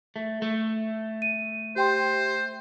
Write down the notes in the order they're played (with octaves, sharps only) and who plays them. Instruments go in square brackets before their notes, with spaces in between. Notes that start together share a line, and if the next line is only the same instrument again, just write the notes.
[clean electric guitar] A3
A3
[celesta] D#7
[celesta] G4 G5 C6 [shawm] C5